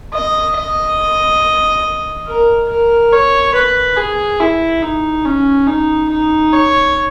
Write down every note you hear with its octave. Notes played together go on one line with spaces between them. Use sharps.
D#5
D#5
A#4
A#4
C#5
B4
G#4
E4
D#4
C#4
D#4
D#4
C#5